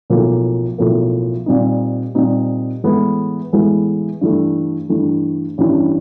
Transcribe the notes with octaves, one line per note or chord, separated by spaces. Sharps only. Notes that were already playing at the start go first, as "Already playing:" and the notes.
B1 A2 F3 A#3
B1 A2 F3 A#3
A#2 G3 C4 D#4
A#2 G3 C4 D#4
A2 E3 G#3 B3
A2 E3 G#3 B3
G2 E3 A3
G2 E3 A3
A1 G2 E3